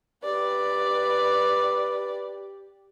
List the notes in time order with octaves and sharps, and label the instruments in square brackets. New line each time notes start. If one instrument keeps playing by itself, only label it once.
[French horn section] G4 [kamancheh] B4 D5